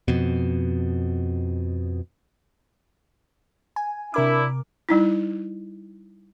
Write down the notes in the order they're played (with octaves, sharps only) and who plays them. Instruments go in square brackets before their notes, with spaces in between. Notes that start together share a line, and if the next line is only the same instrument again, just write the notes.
[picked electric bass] F2 B2
[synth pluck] G#5
[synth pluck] C3 A#4 D6 [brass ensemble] D4 E4
[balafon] G3 D#4 E4